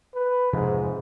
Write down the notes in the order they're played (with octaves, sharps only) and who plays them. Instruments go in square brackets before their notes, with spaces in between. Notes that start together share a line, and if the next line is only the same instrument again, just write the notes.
[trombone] B4
[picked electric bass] F2 C3 F3 [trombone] G#2